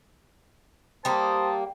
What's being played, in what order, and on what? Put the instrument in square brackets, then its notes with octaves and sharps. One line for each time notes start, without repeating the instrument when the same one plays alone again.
[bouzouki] G3 A#3 [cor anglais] C5 [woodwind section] A5 D#6